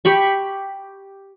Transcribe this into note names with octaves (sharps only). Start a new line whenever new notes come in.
G4 B5 C#6